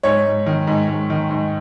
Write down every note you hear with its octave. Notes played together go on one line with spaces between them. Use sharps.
G#2 C#5
G#2
D#3
G#2
G#2
D#3
G#2